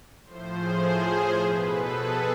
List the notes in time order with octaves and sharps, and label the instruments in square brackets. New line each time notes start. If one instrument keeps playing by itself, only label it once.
[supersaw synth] A2 F3 C5
G#4
B2 B4
A4
G#4